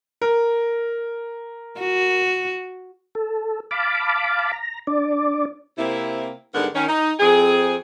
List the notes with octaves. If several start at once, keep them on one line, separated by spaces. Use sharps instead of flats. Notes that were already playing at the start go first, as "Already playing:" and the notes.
A#4
F#4
A4
F5 A5 B5 D6
A#5
D4 D5
C3 A#3 C4 E4
G#2 D3 G3 B3 A#4 F#5
D#3 C#4
D#4
F2 C4 G#4